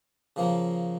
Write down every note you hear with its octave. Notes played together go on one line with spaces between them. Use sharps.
C#3 F3 A#3